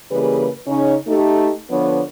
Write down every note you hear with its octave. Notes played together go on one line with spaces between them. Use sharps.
C#3 E3 G3 A#3 G#4 B4
C#3 C#4 D#4
A3 D#4 G4
D3 F3 B3 D4 B4 C#5